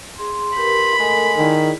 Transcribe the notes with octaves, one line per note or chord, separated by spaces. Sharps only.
G#4 C6
G4 A#4 B4 B5
G#3 A3 A4 A#4
D#3 E4 G#4 D5